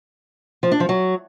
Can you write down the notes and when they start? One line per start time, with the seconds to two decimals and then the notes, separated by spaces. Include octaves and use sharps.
0.63 F3
0.72 D4
0.80 F3
0.89 F#3